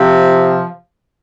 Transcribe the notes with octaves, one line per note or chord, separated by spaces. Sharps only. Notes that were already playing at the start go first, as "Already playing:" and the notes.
Already playing: C3 F3